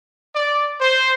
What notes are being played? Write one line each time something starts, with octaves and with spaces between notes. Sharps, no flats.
D5
C5